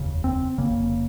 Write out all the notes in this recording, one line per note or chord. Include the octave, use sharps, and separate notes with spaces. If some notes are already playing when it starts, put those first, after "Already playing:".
Already playing: F1 D#2 C#3
C4
F1 F2 C#3 A#3